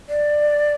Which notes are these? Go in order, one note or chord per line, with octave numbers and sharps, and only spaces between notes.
D5